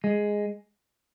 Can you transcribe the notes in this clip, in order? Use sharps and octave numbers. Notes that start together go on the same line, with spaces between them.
G#3